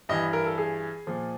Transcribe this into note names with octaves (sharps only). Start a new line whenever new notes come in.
G2 E3 D#5
A#4
A4
G#4
A#2 F3